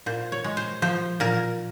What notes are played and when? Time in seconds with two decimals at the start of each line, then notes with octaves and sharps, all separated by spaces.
0.06 A#2 C5
0.32 C#5
0.44 G#3
0.57 C5
0.82 F3 C5
1.20 A#2 A#4